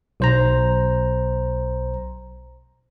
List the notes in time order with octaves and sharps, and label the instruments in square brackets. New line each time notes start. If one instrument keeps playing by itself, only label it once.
[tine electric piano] B1 C5 A#5